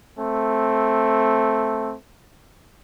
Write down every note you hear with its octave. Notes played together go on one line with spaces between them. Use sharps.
A3 C4